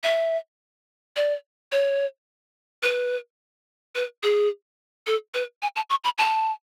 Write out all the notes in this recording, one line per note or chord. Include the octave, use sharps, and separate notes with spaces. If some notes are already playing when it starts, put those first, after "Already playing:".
E5
D5
C#5
B4
B4
G#4
A4
B4
G#5
A5
C#6
B5
A5